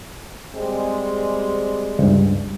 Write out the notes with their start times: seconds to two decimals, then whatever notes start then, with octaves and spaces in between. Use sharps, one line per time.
0.53 G3 G#3 C4
1.99 C#2 G2